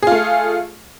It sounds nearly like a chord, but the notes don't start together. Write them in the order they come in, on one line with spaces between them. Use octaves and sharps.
G#4 F4 A3